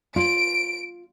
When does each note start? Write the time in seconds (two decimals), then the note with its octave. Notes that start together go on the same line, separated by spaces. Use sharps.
0.16 F4 D7